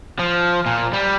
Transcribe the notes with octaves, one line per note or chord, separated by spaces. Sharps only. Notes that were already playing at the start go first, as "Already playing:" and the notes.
F3
A#2
G3